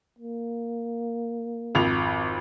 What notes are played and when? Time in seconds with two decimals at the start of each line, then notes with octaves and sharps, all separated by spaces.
0.19 A#3
1.75 G#1 F2 F7